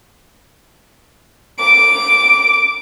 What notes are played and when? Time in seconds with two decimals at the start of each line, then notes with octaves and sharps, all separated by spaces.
1.59 D6